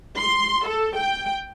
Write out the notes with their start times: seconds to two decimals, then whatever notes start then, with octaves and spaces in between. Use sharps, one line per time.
0.18 C6
0.66 A4
0.96 G5